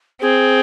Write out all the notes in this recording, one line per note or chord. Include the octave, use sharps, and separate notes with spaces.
C4 G#4